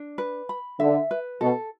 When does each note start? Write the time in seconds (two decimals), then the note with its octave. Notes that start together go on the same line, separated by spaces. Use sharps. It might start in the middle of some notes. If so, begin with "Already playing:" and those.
Already playing: D4
0.18 B4
0.49 B5
0.79 D3 E5
1.11 B4
1.41 B2 A4